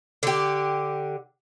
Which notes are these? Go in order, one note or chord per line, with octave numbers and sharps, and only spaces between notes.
D3 G4